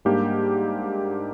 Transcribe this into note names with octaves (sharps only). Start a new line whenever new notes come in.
G#2 G3 A#3 D4 G4